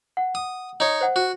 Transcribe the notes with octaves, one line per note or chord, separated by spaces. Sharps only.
F#5
D#6
D#4 C#5
C5 F#5
F#4